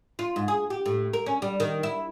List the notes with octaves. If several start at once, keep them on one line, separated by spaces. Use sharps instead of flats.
F4
G#2
G#4
G4
A2
A#4
C#4
G3
D#3
E4